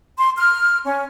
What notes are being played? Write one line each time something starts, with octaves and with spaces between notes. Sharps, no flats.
C6
F6
C#4